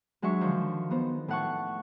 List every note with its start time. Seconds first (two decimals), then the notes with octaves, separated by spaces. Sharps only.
0.22 F#3 G#3 D4 E5 C#6
0.41 D3 D#3 F3
0.91 B3 D#4 C5
1.28 A2 A3 F#5 A5 C#6